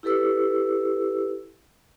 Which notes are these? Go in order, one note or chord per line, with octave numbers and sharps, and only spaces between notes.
E4 G4 A4 B4 E6